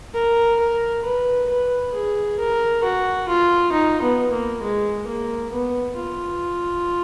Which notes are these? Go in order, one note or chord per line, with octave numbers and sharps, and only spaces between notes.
A#4
A#4
B4
B4
G#4
A#4
F#4
F4
D#4
B3
A#3
G#3
A#3
B3
F4